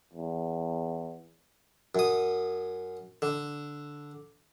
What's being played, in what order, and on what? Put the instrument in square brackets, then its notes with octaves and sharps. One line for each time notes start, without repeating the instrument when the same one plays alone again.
[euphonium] E2
[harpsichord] F#2 D#6
D3